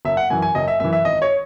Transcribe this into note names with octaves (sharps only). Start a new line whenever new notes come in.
F#1 E5
F#5
F#2 E3 G#5
G#5
F#1 D#5
E5
F#2 E3 E5
E5
G#1 D#5
C#5